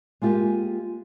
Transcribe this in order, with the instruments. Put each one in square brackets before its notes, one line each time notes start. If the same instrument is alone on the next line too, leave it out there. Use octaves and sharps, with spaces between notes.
[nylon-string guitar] G#3 A#3 F4 G4